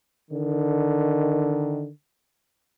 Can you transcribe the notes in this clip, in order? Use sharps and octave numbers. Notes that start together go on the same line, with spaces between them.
D3 D#3